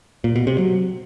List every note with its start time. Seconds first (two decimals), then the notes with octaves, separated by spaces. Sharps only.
0.24 A#2
0.36 B2
0.47 C3
0.58 F#3